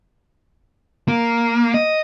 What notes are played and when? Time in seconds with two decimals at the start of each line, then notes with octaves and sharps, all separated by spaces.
1.08 A#3
1.74 D#5